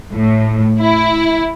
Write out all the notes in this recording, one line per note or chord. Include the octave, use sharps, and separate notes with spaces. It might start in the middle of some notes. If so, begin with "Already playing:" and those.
A2
E4